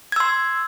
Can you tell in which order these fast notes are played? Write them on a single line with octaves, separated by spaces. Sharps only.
G#6 E6 C6